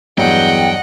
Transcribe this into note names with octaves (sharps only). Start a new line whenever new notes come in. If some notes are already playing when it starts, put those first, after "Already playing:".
E2 G2 F#3 D#5 F#5 G5